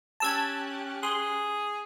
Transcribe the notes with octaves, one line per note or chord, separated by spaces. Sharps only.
C#4 G4 A5 E6 F#6 G#6
G#4 C6